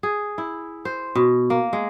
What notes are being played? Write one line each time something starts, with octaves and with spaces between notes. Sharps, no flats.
G#4
E4
C5
B2
A#3
G#3